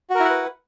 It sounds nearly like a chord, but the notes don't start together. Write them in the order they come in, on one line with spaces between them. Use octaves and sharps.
F#4 A#4 E4 F#5 B4